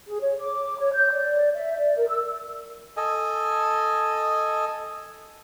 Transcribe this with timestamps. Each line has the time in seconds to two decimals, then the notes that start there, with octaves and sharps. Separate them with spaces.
0.07 G#4
0.21 C#5
0.40 D6
0.79 C#5
0.93 G6
1.12 D5
1.55 E5
1.78 D5
1.96 A#4
2.09 E6
2.97 A4 D#5 G#5